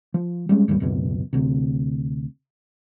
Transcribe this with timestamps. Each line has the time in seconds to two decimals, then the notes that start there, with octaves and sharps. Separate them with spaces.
0.14 F3
0.49 G3 G#3 C#4
0.68 G#1 D#2 G#2 G3
0.80 D1 C#2 F#2 B2
1.33 D2 C3